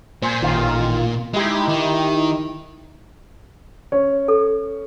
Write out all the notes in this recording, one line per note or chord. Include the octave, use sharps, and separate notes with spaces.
A#2 C5 G#5
A1 D#3 F4
G#3 D#4 E4 G4
D#3
C#4 C#5
A4